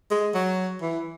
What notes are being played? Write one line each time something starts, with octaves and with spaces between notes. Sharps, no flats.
G#3
F#3
E3